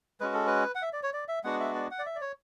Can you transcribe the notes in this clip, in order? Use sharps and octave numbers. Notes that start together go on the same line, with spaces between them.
G#3 C#4 F#4 B4
A4
B4
F#5
E5
D5
C#5
D5
E5
G#3 B3 D4 F#4 F#5
E5
D5
F#5
D5
E5
D5
C#5